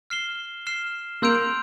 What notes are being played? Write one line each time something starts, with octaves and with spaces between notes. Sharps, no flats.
F6 C7 E7 G7
F6 C7 E7 G7
A#3 C6 E6 G6 D7 F7